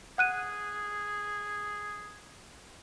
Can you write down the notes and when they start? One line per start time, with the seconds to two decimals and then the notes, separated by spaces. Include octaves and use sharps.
0.18 G#4 F#5 F#6 D#7